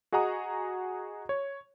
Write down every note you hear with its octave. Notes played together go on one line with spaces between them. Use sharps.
F#4 G#4 D#5 F#5 A#5 D#6
C#5